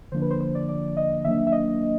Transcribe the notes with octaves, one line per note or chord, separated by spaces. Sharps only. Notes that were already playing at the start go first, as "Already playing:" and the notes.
D3 F3 A#3 D4 C5
B4
C5
C5
D5
D5
D#5
D#3 F#3 A#3 D4 E5
E5
D#5